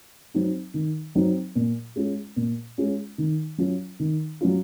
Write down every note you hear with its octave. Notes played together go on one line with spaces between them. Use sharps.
F#3 C4 D#4
D#3
F#3 C4 D#4
A#2
G#3 C#4 F4
A#2
G#3 C#4 F4
D#3
F#3 C#4 F4
D#3
F#3 C#4 F4